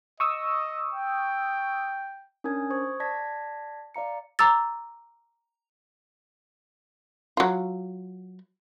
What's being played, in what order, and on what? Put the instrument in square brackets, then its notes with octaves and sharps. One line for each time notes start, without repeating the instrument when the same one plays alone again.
[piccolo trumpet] D#5 [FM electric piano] C#6 D#6 E6
[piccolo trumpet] G5
[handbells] C#4 D4 A#4 G#5 D#6 G#6
C5 C#6 D#6 G#6
D5 A5 G#6 A#6 B6
D5 F5 A#5 C#7
[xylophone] A#5 D6 E6 A6
[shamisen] F#3 F4